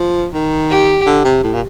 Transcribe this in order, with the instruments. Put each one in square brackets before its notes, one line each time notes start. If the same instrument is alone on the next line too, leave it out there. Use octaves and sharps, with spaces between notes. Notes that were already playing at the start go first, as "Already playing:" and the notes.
Already playing: [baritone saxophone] F3
D#3
[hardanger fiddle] G4
[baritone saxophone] D3
C3
A2
A#2